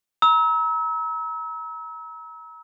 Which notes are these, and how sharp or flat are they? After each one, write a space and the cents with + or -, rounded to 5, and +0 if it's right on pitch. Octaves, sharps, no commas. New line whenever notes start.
A#5 +25 E6 -35